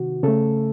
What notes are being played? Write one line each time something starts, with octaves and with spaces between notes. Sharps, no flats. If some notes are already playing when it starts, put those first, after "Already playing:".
Already playing: C3 D#3 F#4
C#3 A3 A4